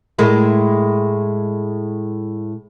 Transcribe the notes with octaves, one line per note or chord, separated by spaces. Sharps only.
A2 G#3 A#4